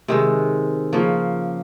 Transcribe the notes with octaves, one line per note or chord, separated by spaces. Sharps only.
C3 D#3 G#3
C#3 F3 A#3